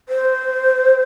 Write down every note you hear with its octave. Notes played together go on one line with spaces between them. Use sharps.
C5